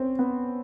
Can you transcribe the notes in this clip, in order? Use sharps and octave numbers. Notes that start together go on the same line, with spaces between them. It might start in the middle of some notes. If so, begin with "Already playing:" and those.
Already playing: C4 C#4
B3